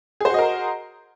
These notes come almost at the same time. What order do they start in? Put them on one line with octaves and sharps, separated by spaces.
G#4 C5 F#4 D#5 A#4